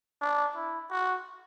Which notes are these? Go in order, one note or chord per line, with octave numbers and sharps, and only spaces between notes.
D4
E4
F#4